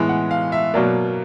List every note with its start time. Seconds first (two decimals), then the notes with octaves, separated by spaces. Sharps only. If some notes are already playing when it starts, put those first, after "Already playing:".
Already playing: A2 E3 G#3 B3
0.09 F#5
0.31 F5
0.52 E5
0.74 B2 F#3 A#3 D5